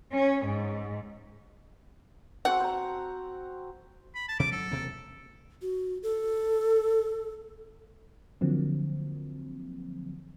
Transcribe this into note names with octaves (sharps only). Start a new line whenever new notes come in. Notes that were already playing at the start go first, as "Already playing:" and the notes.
C#4
G#2
C4 F#4 A4 F#5
C5 A#5
B5
A5
C3 E3 D6
F#3 A4
E1 C3 A#3
F#4
A4
D3 F3 F#3 A#3 C4